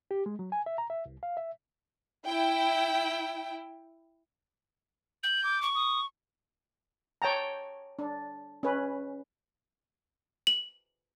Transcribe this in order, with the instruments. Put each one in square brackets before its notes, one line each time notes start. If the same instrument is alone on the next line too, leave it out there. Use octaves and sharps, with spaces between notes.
[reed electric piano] G4
G#3
F#3
G#5
E5
A#5
E5
C2
F5
E5
[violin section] E4 G5
[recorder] G6 [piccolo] F#7
[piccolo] D6
[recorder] C#6
[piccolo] D#6
[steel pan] C#5 G5 A5 A#5
D4
C#4 B4
[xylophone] F#7